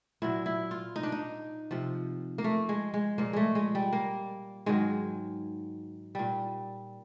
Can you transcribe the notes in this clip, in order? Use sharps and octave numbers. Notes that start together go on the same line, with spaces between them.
A#2 F#3 E4
E4
F4
D#4
D4
D#4
C3 F3
A#3
A3
G#3
G#3
A#2 F3 A#3
G#3 A3
G#3
G3
A#3
G#2 D#3 F#3 G#3
A#2 G3